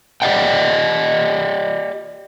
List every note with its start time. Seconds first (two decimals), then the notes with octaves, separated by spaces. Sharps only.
0.22 G4 D5 D#5 F#5 G5